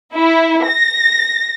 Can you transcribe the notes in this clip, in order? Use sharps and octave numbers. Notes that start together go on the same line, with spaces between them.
E4
A#6